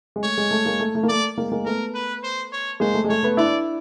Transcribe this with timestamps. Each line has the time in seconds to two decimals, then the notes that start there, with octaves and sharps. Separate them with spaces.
0.16 G#3
0.23 A3 C#5
0.37 G#3
0.51 A3
0.65 G#3 A#3
0.80 A3
0.95 A3
1.03 A#3
1.09 A3 D5
1.38 G#3 A#3
1.52 G#3 A#3
1.65 A3 B3 A#4
1.94 B4
2.23 C5
2.52 C#5
2.80 G#3 A#3 C5
2.94 A3
3.04 G#3
3.09 A3 C#5
3.23 A3 B3
3.37 D4 E4 D5